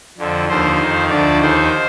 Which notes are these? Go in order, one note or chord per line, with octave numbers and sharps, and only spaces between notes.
F2 D3 F3
D#2 D3 F3 C5
F2 D#3
D2 D3 F3 D5
D#2 D#3 C5